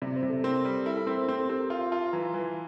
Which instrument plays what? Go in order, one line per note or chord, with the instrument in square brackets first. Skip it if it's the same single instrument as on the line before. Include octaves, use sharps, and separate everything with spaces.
[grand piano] C3 [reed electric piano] D5
[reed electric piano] C5
[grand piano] C3
[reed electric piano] A4
[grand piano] C4 [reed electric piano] A#4
[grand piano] G3
[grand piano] E4 [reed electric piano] A4
[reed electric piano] A4
[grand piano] C4 [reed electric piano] A#4
[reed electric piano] C5
[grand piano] C4 [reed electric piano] C5
[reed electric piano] A4
[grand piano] C4 [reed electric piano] G4
[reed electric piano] A#4
[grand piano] F4 [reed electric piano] F5
[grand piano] F4 [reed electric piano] A5
[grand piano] E3 [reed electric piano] A#5
[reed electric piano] C6
[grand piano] E3
[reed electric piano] C6